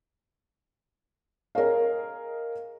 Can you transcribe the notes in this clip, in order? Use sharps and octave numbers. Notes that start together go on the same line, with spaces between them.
G#4 A#4 C#5 D#5 F5